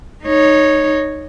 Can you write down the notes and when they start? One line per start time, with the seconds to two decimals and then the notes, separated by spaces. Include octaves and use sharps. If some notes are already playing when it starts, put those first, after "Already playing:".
0.25 D#4 C#5